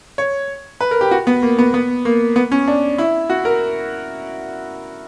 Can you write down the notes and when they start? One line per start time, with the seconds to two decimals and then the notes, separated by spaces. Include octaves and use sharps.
0.18 C#5
0.81 B4
0.91 A#4
1.01 G4
1.11 F#4
1.27 B3
1.42 A#3
1.58 B3
1.74 B3
2.05 A#3
2.36 B3
2.52 C#4
2.68 D4
2.98 E4
3.30 F#4
3.45 A#4